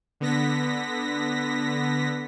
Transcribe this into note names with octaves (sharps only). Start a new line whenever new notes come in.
D3 B3 A#6 B6